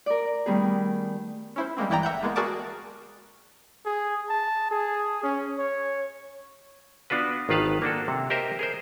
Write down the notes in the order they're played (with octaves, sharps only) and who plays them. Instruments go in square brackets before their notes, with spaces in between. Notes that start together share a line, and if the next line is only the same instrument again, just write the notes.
[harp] A#4 D5
D#3 G3 A3 B3 G#4
[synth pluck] C#4 E4 C5
G3 G#3 A#3 C4
G1 E3 E4 D5 G5 A#5
G1 E5 F#5 G6
G#3 A#3 B3
F#4 G#4 A#4 D5 A5 D6
[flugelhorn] G#4
A5
G#4
C#4
C#5
[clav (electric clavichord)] B3 D4 F4 F#4 B4
G#1 D#3 F4 B4 F5 A5
A#3 D4 F#4 A4
C3
G4 A#4 C5 D#5 E5
G#4 A#4 C5